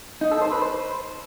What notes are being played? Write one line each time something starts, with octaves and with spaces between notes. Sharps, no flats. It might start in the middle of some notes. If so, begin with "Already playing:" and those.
D#4
A4
C5
B4
C5